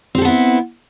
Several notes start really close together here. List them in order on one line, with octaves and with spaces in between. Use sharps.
C4 G4 A4 B3 E4